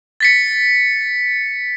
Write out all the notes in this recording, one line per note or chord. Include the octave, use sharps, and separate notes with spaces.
A6 B6 C#7